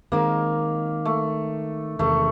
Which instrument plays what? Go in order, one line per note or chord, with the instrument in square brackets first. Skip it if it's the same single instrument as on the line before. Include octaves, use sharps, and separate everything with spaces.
[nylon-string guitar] D#3 G#3 C4 [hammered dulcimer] A#3
[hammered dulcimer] A3
[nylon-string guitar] E2 C3 D#3 G#3 [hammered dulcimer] A3